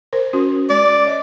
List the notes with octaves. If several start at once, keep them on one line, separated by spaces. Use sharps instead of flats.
A#4 C5
C#4 F#4
G#3 D5
C#5 D#5